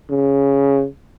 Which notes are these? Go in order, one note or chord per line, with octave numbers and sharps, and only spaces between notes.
C#3